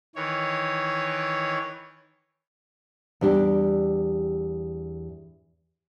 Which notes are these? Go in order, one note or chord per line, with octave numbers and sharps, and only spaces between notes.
D#3 E3 C#5
E2 G3 D4 G4